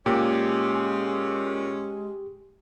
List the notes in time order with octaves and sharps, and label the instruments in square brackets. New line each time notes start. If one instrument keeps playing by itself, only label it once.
[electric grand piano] A#2 [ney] G#3 [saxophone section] C#4 [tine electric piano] G4